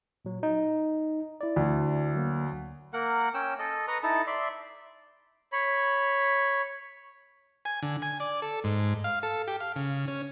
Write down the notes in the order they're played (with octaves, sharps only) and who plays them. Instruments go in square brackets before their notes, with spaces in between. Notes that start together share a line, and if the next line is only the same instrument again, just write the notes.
[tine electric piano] A#2 F#3
D#4
E4 D5
[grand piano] D2
[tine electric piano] F#3 A#3
[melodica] A#3 A#4 F#5
C#4 G5 E6
A4 D#5
B4 D#5 A#5 C#6
D#4 E4 A4 A5
D5 E5 C6
[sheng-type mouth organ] C#5 B5
[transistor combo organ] G#5
D3
G#5
D5
A4
G#2
F5
A4
G4
F5
C#3
C#4